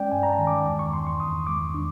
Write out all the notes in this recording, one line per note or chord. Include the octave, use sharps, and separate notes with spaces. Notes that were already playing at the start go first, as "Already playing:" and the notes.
Already playing: G#3 C#4 D5 G5
G2 G#5
A#5
A5
D#3
D6
E2 D6
C#6
E2 C6
C#6
E2 D#6
G#3 D6
D4